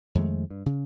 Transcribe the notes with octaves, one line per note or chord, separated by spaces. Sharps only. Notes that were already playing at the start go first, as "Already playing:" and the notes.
F2 D#3 G#3 A3
G2
C#3